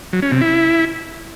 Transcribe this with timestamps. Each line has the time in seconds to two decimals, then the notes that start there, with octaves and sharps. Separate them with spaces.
0.13 F#3
0.22 C#4
0.32 C3
0.41 E4